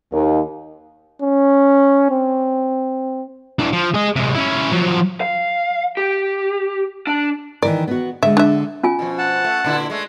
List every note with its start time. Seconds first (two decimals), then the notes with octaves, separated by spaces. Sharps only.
0.13 D#2
1.22 C#4
2.11 C4
3.59 E3 D4
3.73 F3
3.94 G#4 D#5
4.16 C3 G#3
4.34 C#4 E4
4.72 F3 F#3
5.21 F5
5.97 G4
7.07 D4
7.62 D#3 E3 A#4 D5
7.88 B3 F#4
8.23 D3 G#3 E5
8.37 D4 E5
8.83 C#4 F4 G#5
8.99 B2 F3
9.18 F#5 A5
9.44 A3
9.64 A#2 D3 E4
9.90 G#3 A3